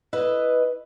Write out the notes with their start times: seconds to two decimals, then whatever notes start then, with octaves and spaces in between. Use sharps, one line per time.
0.13 E4 B4 D#5